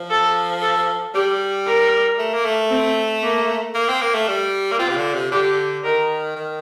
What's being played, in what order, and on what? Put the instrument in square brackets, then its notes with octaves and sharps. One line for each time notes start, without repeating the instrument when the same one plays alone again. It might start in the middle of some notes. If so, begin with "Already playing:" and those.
Already playing: [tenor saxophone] F3
[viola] A4
A4
[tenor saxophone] G3 [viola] G4
[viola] A#4
[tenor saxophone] A3
A#3
A3
[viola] C4
A#3
[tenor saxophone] A#3
C4
A#3
A3
G3
A#3
[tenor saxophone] C4 [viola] F4
[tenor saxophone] C3
D3
C3
[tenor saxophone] D3 [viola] G4
[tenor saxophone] D#3 [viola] A#4
[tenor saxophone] D#3